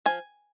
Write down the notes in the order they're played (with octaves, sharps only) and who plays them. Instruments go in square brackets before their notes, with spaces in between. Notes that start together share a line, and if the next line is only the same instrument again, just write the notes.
[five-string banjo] F3 G#5